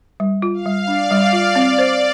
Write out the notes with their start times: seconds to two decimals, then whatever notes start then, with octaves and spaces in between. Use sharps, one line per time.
0.20 G3
0.42 F4
0.54 F5
0.66 G3
0.87 D4 D5
1.11 G3
1.21 D5
1.33 F4
1.55 C4 D5
1.78 C5